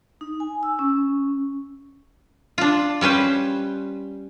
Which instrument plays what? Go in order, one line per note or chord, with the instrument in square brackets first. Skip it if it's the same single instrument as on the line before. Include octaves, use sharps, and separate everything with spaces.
[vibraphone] D#4
G#5
E6
C#4
[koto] D4 F4
G3 C#4 B4 C5